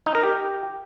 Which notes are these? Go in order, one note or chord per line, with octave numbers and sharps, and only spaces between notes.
D#4
A#4
G4